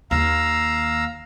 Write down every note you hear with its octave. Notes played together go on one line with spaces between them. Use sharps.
D#2 F5 A#5 E6